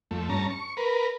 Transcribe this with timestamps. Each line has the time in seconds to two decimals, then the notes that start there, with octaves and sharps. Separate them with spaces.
0.11 F2 A3
0.29 G2 C#4 A5 A#5
0.50 C#6
0.77 A#4 B4